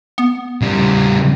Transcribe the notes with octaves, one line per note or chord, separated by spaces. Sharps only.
B3
C#3 G3